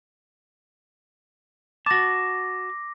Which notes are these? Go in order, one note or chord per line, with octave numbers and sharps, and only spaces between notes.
F#4 A5 D6 A#6